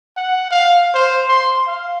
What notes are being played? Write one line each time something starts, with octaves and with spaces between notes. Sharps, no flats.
F#5
F5
C5
C6
F5